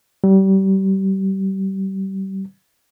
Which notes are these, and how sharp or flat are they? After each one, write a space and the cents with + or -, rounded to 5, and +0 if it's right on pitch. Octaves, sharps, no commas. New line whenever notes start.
G3 -30